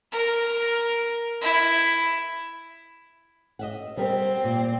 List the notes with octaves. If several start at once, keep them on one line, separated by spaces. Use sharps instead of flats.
A#4
E4
D#5 E5 F#5
G3 B3 C4 A#4 C5
A#2